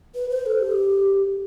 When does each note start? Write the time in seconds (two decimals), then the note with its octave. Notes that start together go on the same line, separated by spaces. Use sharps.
0.15 B4
0.30 C5
0.46 A4
0.61 G4